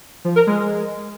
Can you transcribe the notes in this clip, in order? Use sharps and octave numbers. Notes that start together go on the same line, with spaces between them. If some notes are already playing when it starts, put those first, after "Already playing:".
F3
A#4
G#3